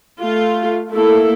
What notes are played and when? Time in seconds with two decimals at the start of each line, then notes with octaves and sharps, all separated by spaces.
0.21 A3 F4
0.91 A3 A#3 E4 A4